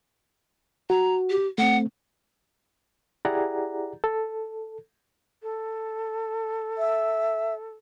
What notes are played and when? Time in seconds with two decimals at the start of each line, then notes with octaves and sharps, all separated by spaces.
0.90 F#4 A#5
1.30 G4
1.58 A3 C4 F#5
3.25 E4 G4 G#4 D5 F#5 A#5
4.04 A4
5.43 A4
6.78 E5